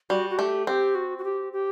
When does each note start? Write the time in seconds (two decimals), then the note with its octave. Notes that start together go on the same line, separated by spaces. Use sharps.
0.10 G3 F#4
0.30 F#4
0.38 A3 G4
0.67 C4 G4
0.95 F#4
1.18 F#4
1.24 G4
1.53 G4